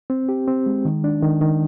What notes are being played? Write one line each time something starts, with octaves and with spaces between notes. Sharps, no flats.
C4
G4
C4
G#3
D#3
D4
D#3
D#3